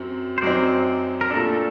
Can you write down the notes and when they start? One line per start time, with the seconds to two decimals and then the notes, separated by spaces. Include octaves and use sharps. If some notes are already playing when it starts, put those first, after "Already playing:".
Already playing: F#2 F#3 C4
0.38 C5
0.42 F#2 F#3 C4 D#4 D5
1.21 A#4
1.30 A#2 A3 D4 A4